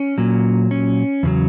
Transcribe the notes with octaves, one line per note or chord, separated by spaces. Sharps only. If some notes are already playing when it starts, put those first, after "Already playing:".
Already playing: C#4
A#2 F#3
C#4
E2 C#3 F#3